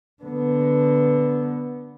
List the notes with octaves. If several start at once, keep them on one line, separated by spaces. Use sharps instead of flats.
D3 B3